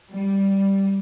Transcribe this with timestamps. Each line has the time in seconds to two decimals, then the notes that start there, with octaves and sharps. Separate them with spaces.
0.12 G3